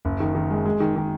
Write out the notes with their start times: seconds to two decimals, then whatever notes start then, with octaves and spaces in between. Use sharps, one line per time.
0.05 F#1
0.20 D#3
0.35 D#3
0.50 G#3
0.65 G#3
0.80 D#3
0.96 D#3